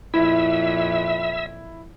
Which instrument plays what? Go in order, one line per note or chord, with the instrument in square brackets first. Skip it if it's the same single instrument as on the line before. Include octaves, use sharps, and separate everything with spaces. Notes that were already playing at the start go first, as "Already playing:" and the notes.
[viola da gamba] F2 A#2 [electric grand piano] E4 [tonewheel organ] E5